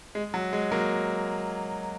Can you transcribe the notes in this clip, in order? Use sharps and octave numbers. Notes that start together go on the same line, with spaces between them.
G#3
F#3
G#3
F#3 A#3